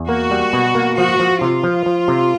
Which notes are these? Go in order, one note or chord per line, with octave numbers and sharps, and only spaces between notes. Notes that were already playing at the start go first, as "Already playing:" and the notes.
Already playing: E2
A#3 F#4
G3
B2
A#3
F3 F#4
F3
C3 F4
F3
F3
C3